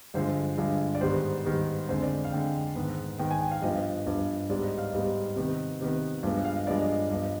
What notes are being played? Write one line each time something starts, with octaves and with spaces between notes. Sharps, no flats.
G2 D3 F3 G#3 C5
G2 D3 F3 G#3
D5
G#2 D#3 G3 B3 C5
G#2 D#3 G3 B3
F2 D3 G#3 C5
D5
F5
F2 D3 G#3 G5
G#2 D#3 B3
G#2 D#3 B3 G5
G#5
G5
F5
G2 F3 B3 D#5
G2 F3 B3
G#2 G3 B3 D5
D#5
F5
G#2 G3 B3 D#5
C3 D#3 B3
C3 D#3 B3
G2 F3 G#3 B3
F5
D#5
G2 F3 G#3 B3 D5
D#5
G2 F3 B3 D#5